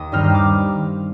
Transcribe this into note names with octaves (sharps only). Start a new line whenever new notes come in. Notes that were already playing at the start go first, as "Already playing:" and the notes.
Already playing: D#2 D#6
G2 D#3 G3 C4 D#4 F6
F6
D6